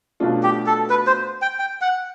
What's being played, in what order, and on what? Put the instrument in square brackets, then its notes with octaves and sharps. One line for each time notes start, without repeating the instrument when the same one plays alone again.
[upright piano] B2 F#3 A3 D4 F4
[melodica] G4
A4
B4
C5
G5
G5
F#5